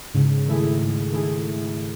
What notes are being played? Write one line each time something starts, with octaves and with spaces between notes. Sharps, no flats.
G#2 C#3
D#3 A3 E4 G#4
G#2
D#3 A3 E4 G#4